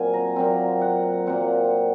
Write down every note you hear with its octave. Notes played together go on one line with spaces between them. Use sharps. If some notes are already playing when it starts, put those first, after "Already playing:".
Already playing: A#2 F#3 C4 A#4 G#5
A#5
A#2 F#3 C4
F#5
A#2 F#3 C4 F#5